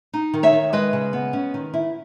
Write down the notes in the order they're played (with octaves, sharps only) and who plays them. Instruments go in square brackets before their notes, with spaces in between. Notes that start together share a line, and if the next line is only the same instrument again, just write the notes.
[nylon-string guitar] D#4
D#3
C#5 E5
D#3
G#3 B4 D#5
C#3
B3
C#4
D#3
E4